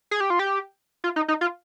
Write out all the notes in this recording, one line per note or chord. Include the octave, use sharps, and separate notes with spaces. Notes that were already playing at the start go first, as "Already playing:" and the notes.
G#4
G4
F4
G4
F4
D#4
D#4
F4